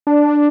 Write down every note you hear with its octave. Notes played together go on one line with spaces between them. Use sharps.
D4